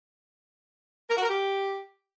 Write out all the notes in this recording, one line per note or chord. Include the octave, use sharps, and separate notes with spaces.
A#4
F#4
A#4
G4